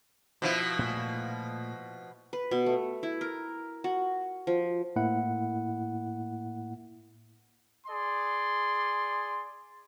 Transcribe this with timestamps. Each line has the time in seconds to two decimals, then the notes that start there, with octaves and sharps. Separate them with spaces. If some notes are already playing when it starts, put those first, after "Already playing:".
0.42 B2 F3 E4
0.79 A#2 A3
2.33 B4
2.51 B2
2.66 A3
3.03 E4
3.21 A#4
3.84 F#4
4.47 F3
4.96 A2 A#3 E4 F#5
7.87 G#4 D5 C6